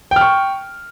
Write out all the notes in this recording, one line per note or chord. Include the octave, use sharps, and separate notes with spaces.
G5 C#6 F6